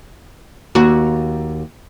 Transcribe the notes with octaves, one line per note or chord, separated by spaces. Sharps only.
D#2 F#4